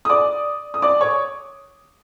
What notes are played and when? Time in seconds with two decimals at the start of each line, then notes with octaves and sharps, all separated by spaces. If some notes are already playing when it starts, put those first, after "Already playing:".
0.05 D#6
0.09 D5 D6
0.74 D#6
0.82 D5 D6
1.01 C#5 C#6